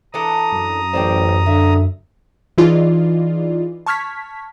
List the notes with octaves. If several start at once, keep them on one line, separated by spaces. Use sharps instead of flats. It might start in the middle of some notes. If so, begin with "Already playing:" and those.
E3 D4 A4 A#5 D#6
F#2
A1 C5 D5 G5
D3 E5
E3 D#4 F4 G#4 D5 D#5
A5 C#6 F6 G#6 B6